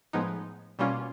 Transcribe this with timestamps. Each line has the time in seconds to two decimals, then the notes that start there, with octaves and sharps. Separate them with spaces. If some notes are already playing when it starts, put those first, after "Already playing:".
0.13 A2 F3 G#3 B3 D#4
0.79 B2 G3 A#3 C#4 F4